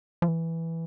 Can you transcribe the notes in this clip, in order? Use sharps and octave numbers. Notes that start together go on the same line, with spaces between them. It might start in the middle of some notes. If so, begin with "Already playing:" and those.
F3
E3